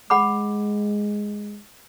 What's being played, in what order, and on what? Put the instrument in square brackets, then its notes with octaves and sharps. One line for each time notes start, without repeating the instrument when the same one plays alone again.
[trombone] G#3 [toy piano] F#5 B5 D6